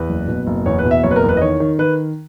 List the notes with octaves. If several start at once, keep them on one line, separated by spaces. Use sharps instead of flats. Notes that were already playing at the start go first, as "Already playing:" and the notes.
Already playing: E2 B4
F#1
B2
F#1
E2 C#5
B4
B2
E5
F#1 C#5
B4
A#4
E2
B4
D#5
D#3 C#5
D#3
D#3 B4